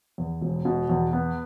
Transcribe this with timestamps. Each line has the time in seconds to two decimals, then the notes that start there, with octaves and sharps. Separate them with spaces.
0.18 E2
0.41 E1
0.65 B2
0.89 E2
1.13 B3